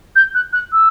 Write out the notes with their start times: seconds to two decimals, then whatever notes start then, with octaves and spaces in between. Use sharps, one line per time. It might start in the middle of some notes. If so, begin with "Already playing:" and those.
0.15 G6
0.34 F#6
0.53 F#6
0.72 E6